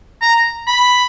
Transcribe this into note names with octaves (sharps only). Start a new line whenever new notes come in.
A#5
B5